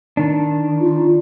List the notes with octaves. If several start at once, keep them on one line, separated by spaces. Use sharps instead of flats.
D#3 D4
F4